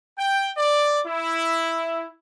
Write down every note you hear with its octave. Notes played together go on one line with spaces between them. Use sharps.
G5
D5
E4